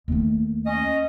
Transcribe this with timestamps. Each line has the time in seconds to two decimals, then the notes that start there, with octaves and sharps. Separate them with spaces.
0.08 D#2 A3
0.66 C#4 D#5